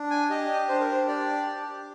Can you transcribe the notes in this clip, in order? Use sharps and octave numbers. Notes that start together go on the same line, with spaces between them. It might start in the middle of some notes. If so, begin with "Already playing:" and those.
Already playing: D4
G#5
G4 D#5
D4 C5
A#4
C5
G4 D5
G4